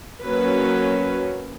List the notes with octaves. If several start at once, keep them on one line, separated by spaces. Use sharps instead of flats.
F#3 A#3 C#4 B4